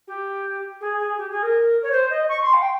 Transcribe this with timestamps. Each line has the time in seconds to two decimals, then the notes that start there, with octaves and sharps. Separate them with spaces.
0.08 G4
0.81 G#4
0.99 G#4
1.18 G4
1.31 G#4
1.43 A#4
1.83 C#5
1.92 C5
2.10 D#5
2.29 C#6
2.42 C6
2.54 F5
2.62 G5